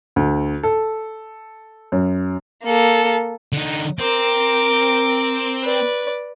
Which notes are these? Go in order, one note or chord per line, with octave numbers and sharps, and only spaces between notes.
D2
A4
F#2
A#3 A4
D3 D#4
C4 A#4 D6
B4 D5